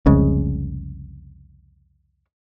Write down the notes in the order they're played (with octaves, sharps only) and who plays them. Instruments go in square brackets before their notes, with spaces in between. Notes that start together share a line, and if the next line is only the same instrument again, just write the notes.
[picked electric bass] F1 C2 C#3 G#3